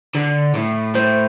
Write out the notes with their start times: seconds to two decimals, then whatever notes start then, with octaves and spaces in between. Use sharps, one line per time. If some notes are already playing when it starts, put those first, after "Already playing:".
0.15 D3
0.55 A2
0.95 A2 C5